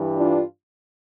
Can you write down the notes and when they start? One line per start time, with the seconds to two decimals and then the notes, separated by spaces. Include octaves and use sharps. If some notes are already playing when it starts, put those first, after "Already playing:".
Already playing: G2 E3 G3
0.17 D4 F4